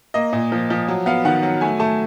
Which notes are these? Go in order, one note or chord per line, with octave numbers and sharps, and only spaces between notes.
A#3 D#5
A#2
F3
F3
F#3
B3 F5
D#3 F#5
F#3
A3 G#5
A3 A5